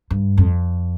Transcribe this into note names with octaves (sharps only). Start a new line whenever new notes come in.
G2
F2